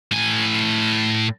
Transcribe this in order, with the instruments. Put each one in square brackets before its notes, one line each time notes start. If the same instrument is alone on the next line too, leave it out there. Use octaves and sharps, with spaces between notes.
[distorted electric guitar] A2 G#5